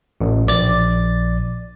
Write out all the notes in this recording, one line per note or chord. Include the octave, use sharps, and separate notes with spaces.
A1
A#1 D5 A6